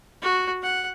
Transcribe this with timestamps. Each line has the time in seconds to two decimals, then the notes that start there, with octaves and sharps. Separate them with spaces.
0.22 F#4
0.62 F#5